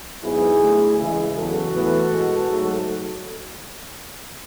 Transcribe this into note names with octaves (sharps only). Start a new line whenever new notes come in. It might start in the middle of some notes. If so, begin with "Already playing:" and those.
G#2 F#3 B3 E4 G#4
D2 D3 A3
C#2 C#3 E3 G#3 E4 G#4
E2 C#3 F#3 F#4 A4
A2 E3 B3
B2 G#3 B3
G#2 F#3 A3